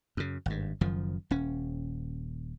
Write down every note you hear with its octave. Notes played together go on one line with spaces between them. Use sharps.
F#2 C#3
G#1 G2
F#1 F#2 D#3 F3
D#1 C#4